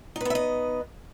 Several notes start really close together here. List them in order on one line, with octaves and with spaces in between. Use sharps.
D#4 B4 B3 E5 D#5